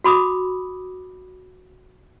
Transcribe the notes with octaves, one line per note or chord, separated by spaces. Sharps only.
F#4 B5 D6 D#6